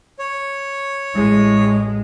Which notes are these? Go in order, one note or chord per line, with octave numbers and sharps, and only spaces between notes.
C#5
A1 G#3